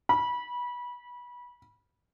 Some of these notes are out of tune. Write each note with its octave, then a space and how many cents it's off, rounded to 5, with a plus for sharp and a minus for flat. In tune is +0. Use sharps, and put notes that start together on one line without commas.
B5 -20